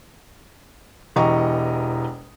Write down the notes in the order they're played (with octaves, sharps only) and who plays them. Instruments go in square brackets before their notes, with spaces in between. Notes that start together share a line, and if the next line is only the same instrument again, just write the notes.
[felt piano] E1 E3 G4 D#5 A#5 C#6